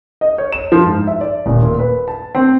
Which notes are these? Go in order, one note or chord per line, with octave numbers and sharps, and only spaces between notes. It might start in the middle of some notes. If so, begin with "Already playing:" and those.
D#5
C#5
E7
F3
G#2
E5
D5
D#1
A#2
B4
A5
C4